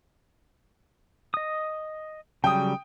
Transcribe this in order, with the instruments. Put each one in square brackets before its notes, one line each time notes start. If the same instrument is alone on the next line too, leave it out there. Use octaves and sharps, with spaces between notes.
[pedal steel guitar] D#5 D#6
[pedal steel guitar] C#3 F#3 G3 [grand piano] G5 D#6